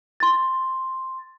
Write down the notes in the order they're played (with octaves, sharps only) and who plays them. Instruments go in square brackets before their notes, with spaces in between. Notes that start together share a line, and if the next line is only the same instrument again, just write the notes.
[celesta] C6 A6